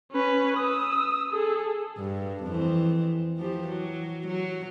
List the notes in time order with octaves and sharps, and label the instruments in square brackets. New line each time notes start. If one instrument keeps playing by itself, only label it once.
[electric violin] C#4 B4
D#6 E6
G#4 A4
[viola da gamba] G2
F2 E3 C4
E3 F3 G4
F#3
F#3